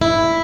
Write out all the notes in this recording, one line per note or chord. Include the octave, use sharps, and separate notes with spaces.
E4